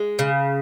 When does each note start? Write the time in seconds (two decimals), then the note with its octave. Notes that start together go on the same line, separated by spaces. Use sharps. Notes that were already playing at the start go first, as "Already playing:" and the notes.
Already playing: G#3
0.19 C#3